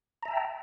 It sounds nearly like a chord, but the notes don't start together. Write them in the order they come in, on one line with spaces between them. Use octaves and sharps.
A#5 E5 A5 G5